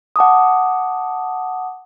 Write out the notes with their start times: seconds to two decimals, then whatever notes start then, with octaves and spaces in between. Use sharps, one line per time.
0.16 F#5 A5 D6 D#6